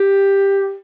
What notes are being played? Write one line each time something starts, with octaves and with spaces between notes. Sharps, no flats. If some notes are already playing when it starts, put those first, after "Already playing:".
Already playing: G4